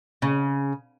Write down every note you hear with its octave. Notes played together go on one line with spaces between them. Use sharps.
C#3